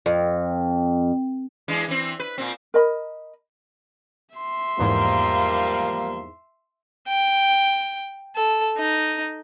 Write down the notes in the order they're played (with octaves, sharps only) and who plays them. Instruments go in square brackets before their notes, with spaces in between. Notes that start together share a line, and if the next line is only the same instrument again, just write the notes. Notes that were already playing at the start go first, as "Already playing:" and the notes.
[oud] F2
[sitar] E3 G#3 D4
E3 C4
B4
A#2 C4
[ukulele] A#4 D#5 B5
[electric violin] E5 C6
[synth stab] E2 G#2 [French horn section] F3 G3 A#3
[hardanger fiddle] G5
A4
D#4